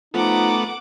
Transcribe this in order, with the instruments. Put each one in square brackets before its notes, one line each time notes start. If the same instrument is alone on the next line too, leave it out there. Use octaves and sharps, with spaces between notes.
[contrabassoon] F3 [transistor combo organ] A3 B3 [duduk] D#4 [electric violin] F#5 D6